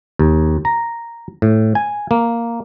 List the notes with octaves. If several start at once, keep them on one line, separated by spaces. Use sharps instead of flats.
D#2
A#5
A2
G#5
A#3